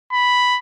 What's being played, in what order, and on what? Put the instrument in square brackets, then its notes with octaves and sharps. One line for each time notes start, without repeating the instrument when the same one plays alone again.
[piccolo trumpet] B5